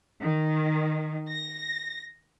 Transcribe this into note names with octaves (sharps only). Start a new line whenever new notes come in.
D#3
A#6